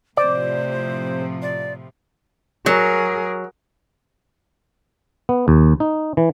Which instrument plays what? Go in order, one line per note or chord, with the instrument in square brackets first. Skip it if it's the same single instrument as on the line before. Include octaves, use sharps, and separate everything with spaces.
[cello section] A2 C3 F3 [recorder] C5 [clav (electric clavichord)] D5
[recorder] D5
[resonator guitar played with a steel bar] F#3 [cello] G#4 A#4
[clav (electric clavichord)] B3
D#2
D#4
E3